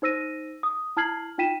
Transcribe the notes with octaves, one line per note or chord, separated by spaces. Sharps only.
D#4 C5 E6 A#6 D#7
D#6
E4 A5 F6 G#6 C7 F#7
D#4 F4 G5 B6 D#7 E7